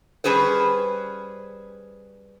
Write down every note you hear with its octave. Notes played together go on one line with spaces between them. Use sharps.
G3 C#4 G#4 B4 C5